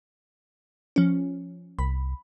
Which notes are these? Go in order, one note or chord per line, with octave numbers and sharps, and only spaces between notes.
F3 C#4
C2 B5